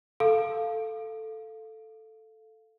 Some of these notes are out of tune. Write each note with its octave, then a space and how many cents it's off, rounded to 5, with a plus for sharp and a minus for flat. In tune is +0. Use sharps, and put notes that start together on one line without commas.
A4 +0 F5 +0